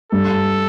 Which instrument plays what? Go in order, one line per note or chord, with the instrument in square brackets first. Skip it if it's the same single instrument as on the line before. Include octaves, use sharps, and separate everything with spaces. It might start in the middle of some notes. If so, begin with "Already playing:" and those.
[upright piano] G2 [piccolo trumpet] A4